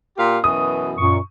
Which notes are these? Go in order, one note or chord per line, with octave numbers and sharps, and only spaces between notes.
A#2 G4 F5
F#2 B2 E3 D#6
F#2 A#2 C#6